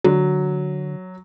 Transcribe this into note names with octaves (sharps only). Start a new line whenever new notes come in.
D3 F#3